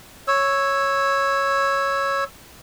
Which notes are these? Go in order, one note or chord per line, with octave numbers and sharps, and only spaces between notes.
C#5 E6